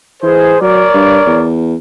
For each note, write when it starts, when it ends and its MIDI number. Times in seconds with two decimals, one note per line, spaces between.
0.23 0.54 52
0.23 0.57 68
0.23 0.57 72
0.61 0.84 54
0.61 1.47 70
0.61 1.47 73
0.61 1.47 74
0.94 1.20 43
1.26 1.75 40